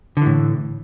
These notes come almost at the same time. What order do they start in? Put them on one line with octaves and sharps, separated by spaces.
D3 E3 A2